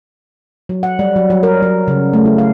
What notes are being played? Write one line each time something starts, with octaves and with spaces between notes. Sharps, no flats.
F#3
F#5
G3
F#3
F#3
A#4
F#3
C#3
A3
E4
F5